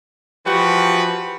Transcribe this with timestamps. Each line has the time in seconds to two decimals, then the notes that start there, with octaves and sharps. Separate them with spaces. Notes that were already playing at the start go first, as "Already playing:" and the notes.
0.46 E3 F3 F#4 G4 B4